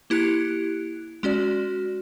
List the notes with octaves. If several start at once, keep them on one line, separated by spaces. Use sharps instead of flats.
A#3 E4 G4 F#6 C#7
G#3 C#4 F#4 D5